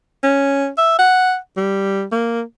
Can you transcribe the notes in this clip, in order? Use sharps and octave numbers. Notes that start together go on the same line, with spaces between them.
C#4
E5
F#5
G3
A#3